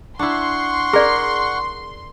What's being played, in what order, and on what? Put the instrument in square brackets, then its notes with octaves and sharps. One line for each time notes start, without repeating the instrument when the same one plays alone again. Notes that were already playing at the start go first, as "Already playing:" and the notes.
[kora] D4 E4 [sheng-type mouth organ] F#5 C#6 [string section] C6
[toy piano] G#4 D5 [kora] A#4